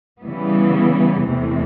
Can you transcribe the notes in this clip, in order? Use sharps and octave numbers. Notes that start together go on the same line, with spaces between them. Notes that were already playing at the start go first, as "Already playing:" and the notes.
C#3 E3 G3 B3
E2 C3 E3 A3